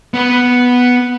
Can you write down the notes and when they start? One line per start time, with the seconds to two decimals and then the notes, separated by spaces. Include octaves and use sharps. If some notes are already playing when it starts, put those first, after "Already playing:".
0.14 B3 B4